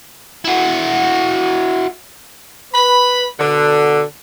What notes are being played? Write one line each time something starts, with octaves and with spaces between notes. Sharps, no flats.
E4 F#4
B4 B5
B2 D3